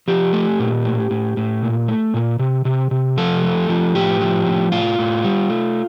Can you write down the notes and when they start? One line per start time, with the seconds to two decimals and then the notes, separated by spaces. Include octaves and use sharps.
0.08 F3 G4
0.33 A3
0.59 A#2
0.85 A2
1.11 A2
1.37 A2
1.62 A#2
1.88 A3
2.14 A#2
2.39 C3
2.65 C3
2.91 C3
3.17 F3 A4
3.43 A3
3.69 F3
3.95 A2 G4
4.21 F3
4.46 A2
4.72 A2 F4
4.99 A2
5.24 G3
5.49 A3